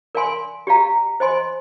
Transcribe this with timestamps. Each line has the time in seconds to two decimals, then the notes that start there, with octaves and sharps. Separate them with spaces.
0.15 A#4 D5 F5 G#5 C6
0.67 G4 D5 F5 A#5
1.20 C5 D#5 G#5 C6